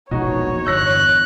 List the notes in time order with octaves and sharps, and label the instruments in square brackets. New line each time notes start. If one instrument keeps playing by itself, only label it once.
[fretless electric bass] E1 A#1 B2 [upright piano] D#4 F#4 [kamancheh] C#5
[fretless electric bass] G1 E2 [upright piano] E6 A#6 [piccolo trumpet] F#6